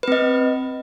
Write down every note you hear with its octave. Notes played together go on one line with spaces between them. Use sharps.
C4 B4 D#5